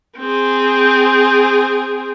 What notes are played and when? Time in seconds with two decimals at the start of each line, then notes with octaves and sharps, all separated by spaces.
0.18 C4 G#4